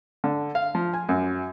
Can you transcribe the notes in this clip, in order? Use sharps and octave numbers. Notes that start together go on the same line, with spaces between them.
D3
F5
F3
G#5
F#2